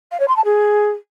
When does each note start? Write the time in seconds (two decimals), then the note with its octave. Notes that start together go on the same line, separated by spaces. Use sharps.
0.11 F5
0.20 C#5
0.28 C6
0.36 A5
0.44 G#4